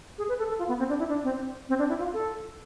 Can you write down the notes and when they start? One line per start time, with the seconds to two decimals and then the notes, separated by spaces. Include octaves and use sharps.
0.18 G#4
0.29 B4
0.38 A4
0.49 A4
0.59 F4
0.68 B3
0.79 C4
0.89 D4
0.99 E4
1.09 D4
1.24 C4
1.69 C4
1.79 D4
1.89 E4
1.99 F4
2.13 A4